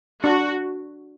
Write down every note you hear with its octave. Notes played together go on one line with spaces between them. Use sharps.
D4 F#4